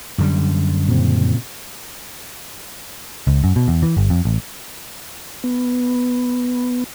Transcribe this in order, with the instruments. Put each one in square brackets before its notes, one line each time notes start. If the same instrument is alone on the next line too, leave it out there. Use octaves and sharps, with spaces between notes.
[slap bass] F#2 D3 G3
[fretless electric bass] A#2 C#3 C4
[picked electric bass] C#2
F#2
B2
E2
E3
G1
F2
A1
[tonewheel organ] B3